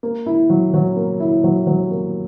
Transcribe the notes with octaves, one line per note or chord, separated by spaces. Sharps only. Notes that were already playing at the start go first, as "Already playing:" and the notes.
A#3
E4
F#3
F#3
A#3
E4
F#3
F#3
A#3